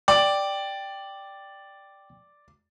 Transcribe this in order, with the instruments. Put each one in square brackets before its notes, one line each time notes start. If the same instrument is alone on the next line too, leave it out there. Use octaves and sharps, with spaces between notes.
[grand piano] D5 [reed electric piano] G5